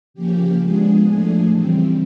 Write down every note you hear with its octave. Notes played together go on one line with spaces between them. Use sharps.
C#3 F3 A#3 C#4 G4
F3 G#3 B3 D4 G#4
A2 F3 A3 D4
C#3 E3 G3 C4